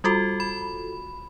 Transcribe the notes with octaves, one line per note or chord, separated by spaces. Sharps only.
G3 F4 F#4 A4
B5